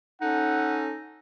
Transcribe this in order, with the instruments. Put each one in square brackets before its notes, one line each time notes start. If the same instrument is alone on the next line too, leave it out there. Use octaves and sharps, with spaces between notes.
[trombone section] C#4 A4 [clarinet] D#4 [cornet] F#5